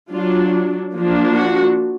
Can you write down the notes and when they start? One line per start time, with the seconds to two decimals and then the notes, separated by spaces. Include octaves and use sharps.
0.10 F#3 D4 F4
0.94 F3 A#3 D4
1.35 F#4